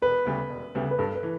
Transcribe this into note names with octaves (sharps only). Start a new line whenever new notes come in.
E1 B4
D2 C#3 G3 B3
E1
D2 C#3 G3 B3
B4
G2 A4
B4
E3